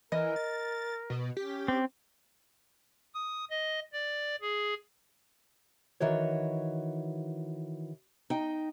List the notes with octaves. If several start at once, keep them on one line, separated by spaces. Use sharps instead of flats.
E3 A#4 D#5
A6
B2
C#4 G4
C4
D#6
D#5
D5
G#4
D#3 E3 F#4 C#5
D#4 G5